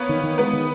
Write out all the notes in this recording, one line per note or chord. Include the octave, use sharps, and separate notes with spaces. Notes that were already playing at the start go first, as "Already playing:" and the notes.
Already playing: A#3 B3 B4 C#5
D#3
D#3
G#3 B3 B4
D#3